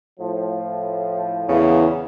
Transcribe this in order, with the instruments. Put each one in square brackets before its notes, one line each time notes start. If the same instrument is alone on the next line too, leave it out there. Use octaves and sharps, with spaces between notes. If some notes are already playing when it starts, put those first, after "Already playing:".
[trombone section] A2 F3
[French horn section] E2 [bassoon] C#3